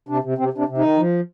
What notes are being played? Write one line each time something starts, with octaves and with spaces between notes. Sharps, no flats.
C3 D4
C3
C3 C4
C3 D4
C3
D#3 D#4
F3